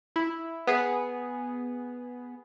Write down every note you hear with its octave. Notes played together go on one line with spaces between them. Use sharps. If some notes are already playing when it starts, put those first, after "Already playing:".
E4
B3 G#4